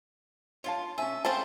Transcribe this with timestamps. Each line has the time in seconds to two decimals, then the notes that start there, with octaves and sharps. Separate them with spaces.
0.64 F4 C#5 F5 A5
0.98 C#4 E5 G#5
1.25 C4 G#4 A4 C5 F5